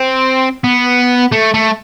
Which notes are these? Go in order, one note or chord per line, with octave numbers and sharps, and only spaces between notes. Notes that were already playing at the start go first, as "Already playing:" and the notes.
Already playing: C4
B3
A3
A3